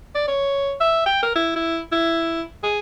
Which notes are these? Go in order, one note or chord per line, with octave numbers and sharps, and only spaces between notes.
D5
C#5
E5
G5
A#4
E4
E4
E4
G#4